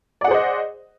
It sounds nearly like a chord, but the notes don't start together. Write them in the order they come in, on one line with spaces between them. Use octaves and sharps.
D5 F#5 G#4 C5 D#5